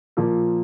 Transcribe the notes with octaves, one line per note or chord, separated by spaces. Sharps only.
A#2 F3 A#3